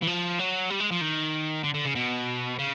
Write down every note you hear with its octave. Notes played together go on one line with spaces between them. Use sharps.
E3
F3
F#3
G3
G#3
F3
D#3
D3
D3
C#3
B2
C#3